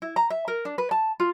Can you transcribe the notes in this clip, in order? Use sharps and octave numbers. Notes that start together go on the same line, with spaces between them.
E4
A#5
E5
A#4
D4
B4
A5
F4